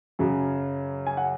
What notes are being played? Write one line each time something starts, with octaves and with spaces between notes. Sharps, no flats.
F#2 C#3 F#3
G#5
F#5